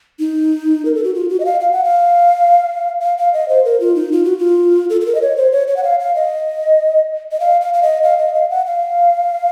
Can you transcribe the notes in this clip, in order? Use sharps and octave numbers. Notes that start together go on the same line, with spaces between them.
D#4
A#4
A4
F#4
F4
F#4
D#5
F5
F5
F#5
F5
F5
F5
D#5
C5
A#4
F4
D#4
F4
F#4
F4
A4
A4
A#4
D#5
C#5
C5
C#5
C#5
F#5
F5
F5
D#5
D#5
F5
F5
F5
D#5
F5
D#5
F5
F#5
F5